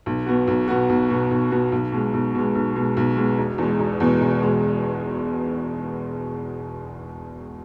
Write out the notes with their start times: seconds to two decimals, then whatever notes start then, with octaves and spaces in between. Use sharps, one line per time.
0.06 B1
0.26 B2 B3 F#4
0.47 B1
0.68 B2 B3 F#4
0.89 B1
1.10 B2 B3 F#4
1.31 B1
1.51 B2 B3 F#4
1.72 B1
1.92 B2 G#3
2.14 B1
2.35 B2 G#3
2.55 B1
2.76 B2 G#3
2.97 B1
3.17 B2 G#3
3.38 E1
3.58 E2 B2 G#3
3.79 E1
4.00 E2 B2 G#3
4.21 E1
4.42 E2 B2 G#3